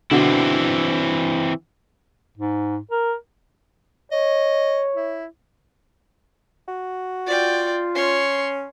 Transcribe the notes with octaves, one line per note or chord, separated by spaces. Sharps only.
B2 D3 E3 C4 E4
G#2
A#4
C#5 D#5
E4
F#4
F4 D5 G5
C#4 C#5 C6